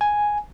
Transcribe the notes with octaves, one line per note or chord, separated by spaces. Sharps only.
G#5